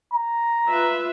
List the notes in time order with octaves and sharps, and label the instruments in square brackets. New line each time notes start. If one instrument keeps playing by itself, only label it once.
[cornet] A#5
[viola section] F4 B4 E5